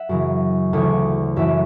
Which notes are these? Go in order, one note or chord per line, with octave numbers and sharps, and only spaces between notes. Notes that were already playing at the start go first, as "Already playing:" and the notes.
Already playing: E5 F#5
F#2 C#3 E3
D2 C#3 E3 C#5
F#2 E3 E5